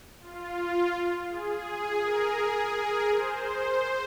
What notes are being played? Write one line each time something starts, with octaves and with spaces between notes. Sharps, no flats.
F4
G#4
A#4
G#4
A#4
C5